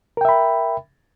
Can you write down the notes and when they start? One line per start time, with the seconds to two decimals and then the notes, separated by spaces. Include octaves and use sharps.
0.17 A#4
0.21 G5
0.25 E5
0.29 B5